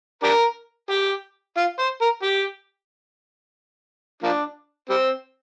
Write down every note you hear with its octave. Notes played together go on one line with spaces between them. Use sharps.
D4 G4 A#4
G4
F4
C5
A#4
G4
F3 A#3 D4
G3 C4